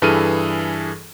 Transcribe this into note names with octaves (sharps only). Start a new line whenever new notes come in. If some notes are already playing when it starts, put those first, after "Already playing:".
G2 E3 G#4 A4 F6 D#7